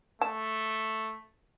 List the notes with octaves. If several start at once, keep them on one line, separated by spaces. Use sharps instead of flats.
A3 A5